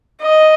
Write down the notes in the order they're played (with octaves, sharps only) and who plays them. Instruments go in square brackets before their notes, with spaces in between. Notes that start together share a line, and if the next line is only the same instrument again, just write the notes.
[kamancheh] D#5